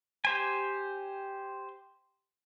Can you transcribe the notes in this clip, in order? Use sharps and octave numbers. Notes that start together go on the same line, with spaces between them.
G4 C5 G#5